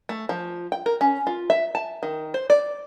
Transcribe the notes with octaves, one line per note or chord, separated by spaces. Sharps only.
A3
F3
G5
A#4
C#4
F4
E5
A5
D#3
C5
D5